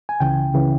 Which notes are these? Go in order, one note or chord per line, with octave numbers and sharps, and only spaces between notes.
G#5
C#2 C#3 E3 G5
C#2 C#3 E3